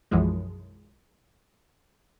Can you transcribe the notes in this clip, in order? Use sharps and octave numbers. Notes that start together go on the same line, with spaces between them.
B1 F#2 E3 F3 G#3